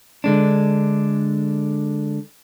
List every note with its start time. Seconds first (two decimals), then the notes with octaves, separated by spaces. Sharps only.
0.24 D3 G#3 D4